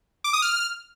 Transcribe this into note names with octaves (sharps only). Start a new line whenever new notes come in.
D6
D#6
F6